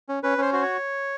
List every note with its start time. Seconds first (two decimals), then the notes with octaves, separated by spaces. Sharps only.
0.09 C#4
0.23 C#4 B4
0.38 C#4 C5
0.53 F#4 C5
0.62 C#5